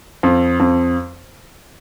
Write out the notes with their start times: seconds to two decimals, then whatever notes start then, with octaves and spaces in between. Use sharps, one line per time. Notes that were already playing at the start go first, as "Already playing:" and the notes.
0.23 F2
0.60 F2